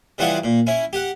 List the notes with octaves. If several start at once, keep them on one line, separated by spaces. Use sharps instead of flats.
C#3 E3 G3 F4 F#5 C#6
A#2
C#4 E4
G4 F#5